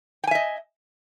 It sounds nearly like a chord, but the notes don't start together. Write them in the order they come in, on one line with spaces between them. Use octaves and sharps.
G5 G#5 E5 D#5